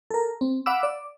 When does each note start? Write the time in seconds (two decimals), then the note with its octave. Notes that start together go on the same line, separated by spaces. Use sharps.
0.11 A4 A#4
0.41 C4
0.66 F5 F#5 B5 D6 E6
0.83 D5